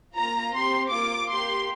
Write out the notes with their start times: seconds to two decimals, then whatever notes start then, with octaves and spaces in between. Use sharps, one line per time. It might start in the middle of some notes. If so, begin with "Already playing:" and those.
0.15 A#3 F4 A#5
0.54 C4 G4 C6
0.91 A#3 F4 D6
1.30 A#3 G4 C6